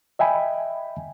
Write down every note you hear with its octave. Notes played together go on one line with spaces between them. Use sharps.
D#5 E5 G5 G#5 B5